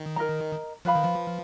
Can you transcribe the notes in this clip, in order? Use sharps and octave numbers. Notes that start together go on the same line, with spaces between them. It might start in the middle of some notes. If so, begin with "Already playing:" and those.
Already playing: D#3
A#4 D#5 A#5
F3 B4 F5 B5
D#3
F3